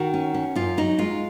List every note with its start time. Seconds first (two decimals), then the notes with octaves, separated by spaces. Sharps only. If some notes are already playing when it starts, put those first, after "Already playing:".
Already playing: D#3 F#4
0.14 C#4
0.34 C#4
0.55 F#2 F4
0.77 F#3 D#4
0.98 G#3 F4